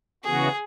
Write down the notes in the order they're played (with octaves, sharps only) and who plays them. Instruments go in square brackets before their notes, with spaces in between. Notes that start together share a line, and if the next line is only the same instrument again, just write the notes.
[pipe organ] C#3 E3 B3 F#4 [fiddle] G#4